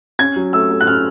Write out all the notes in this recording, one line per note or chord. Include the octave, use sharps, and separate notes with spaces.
C#4 G#6
F#3
A3 E6
A3
F#6
C#4 F6